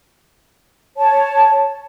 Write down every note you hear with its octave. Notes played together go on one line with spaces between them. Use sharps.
C#5 A5